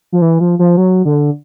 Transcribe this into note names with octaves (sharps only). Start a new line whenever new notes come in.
F3
E3
F3
F3
F#3
D3